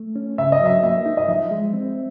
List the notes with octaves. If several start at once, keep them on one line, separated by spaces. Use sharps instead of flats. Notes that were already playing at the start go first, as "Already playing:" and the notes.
Already playing: A3
C#4
C#3 E5
D#5
F#3 E5
A#3 E5
D#4
D#5
F3 E5
G#3
C4